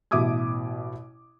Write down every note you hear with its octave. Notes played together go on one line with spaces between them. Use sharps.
A1 B2 E5 D6 D#6 G#6